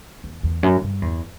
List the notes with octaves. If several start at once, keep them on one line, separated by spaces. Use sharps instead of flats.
E2
E2
F#2
G2
E2